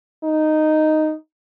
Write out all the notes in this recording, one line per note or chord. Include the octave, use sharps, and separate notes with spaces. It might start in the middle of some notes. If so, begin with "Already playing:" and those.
D#4